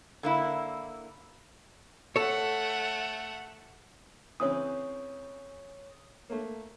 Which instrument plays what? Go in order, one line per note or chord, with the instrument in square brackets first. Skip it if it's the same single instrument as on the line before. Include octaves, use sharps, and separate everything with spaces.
[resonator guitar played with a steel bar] D3 A#3 E4
[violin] A3 F#5 [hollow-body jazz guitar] A4 C#5
[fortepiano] C#3 E3 C4 [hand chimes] C#5 D#6
[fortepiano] A3 A#3